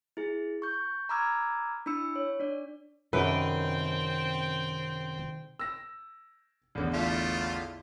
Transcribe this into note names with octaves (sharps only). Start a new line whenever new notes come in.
E4 G#4
C#6 G6
A#5 B5 D6 E6 F6 G#6
D4 E4 B5 E6 C#7
C#5
D4 D5
F#2 C3 D#3 C4 B4 E5 G5
E6 A#6
A1 E2 D3
A3 F4